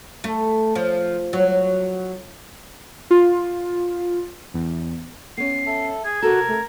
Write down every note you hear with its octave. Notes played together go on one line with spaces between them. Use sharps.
A3
F3
F#3
F4
E2
B3 C#4 C7
A4 E5
G#4 G#6
C3 F#4 A4 A#4
A3